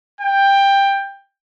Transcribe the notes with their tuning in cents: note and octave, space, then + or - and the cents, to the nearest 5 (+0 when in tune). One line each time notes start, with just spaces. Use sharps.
G5 +15